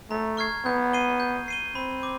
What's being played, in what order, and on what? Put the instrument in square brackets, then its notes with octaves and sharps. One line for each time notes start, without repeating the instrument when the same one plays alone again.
[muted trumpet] A3 [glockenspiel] A#5
[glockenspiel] C#6 F6 G#6 C7
[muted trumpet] B3 [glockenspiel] G6
[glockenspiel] C7 D#7 G7
G6
C7 D#7 G7
[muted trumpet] C4 [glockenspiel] B5
[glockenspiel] D6